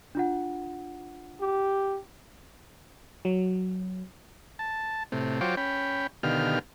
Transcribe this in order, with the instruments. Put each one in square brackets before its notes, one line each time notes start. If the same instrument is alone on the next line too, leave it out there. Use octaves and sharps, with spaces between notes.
[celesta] D4 F4 F#5
[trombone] G4
[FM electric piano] F#3
[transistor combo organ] A5
A2 C3
F#3 F4 C5 C#5 G5 D6
C#4 G5 B5
B2 D3 D#3 G4 F5 F6